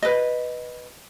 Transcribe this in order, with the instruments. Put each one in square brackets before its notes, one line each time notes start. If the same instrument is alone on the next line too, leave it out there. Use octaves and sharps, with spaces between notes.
[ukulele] B4 D#5